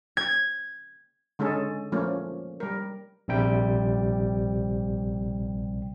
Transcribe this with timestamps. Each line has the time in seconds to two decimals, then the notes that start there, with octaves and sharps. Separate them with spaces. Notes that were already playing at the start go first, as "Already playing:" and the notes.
0.17 G#6
1.39 D3 G#3 C#4 G#4 A4
1.92 F3 A3 A#3 C#4
2.60 G3 A#4
3.28 A#1 C3 G3 G5